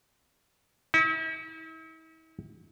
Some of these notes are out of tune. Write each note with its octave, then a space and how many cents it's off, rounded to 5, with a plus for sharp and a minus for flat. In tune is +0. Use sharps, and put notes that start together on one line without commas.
E4 -45